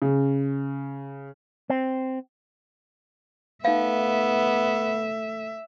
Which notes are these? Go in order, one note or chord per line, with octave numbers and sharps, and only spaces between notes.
C#3
C4
A3 B3 D#4 E5 F5